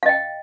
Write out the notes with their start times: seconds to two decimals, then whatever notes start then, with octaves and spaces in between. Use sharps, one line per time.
0.03 F5
0.06 D#5
0.09 G5